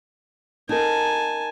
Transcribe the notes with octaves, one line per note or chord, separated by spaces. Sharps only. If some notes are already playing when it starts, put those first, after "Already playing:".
D#4 A#4 G#5 A5